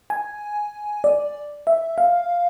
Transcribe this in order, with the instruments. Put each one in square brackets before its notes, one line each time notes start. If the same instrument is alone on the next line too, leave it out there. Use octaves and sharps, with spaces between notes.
[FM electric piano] G#5
D5
E5
F5